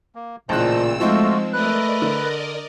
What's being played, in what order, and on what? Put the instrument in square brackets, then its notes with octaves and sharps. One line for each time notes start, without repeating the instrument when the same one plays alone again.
[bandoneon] A#3
[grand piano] A1 C#3 F#6 [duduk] A#2 [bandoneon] C5 D#5 A5 [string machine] E6
[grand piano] F3 C4 D#4 [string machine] G#3 [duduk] A3 [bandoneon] F4 F#4
[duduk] A3 [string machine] A#4 D5 D#5 [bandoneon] B4 F#6
[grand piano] D3